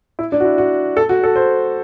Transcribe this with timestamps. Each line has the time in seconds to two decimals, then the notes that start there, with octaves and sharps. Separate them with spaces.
0.19 E4
0.32 D4
0.40 F#4
0.45 E4
0.58 F#4
0.97 A4
1.09 F#4
1.23 A4
1.36 C5